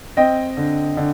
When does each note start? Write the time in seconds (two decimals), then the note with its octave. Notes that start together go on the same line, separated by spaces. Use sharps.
0.17 C4 D#5 G5
0.57 D3
0.97 D3